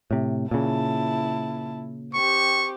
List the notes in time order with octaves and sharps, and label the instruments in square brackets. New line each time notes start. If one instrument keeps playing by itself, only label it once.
[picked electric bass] A2 C3
[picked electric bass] A#2 C#3 [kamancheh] E4 A5
[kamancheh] C4 G4 [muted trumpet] C#6